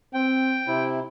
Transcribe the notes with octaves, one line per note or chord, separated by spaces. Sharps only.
C4 G5
C3 E4 C5